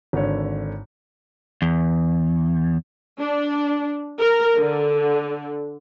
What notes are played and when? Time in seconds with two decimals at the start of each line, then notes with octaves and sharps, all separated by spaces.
0.13 G#1 D3 C#5
1.62 E2
3.19 D4
4.20 A#4
4.57 D3